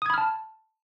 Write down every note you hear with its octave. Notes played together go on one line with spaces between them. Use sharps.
A5 B5 D#6 F6 G#6